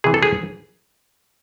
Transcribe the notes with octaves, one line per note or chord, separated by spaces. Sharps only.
C3 E3 G#4
A4
G#4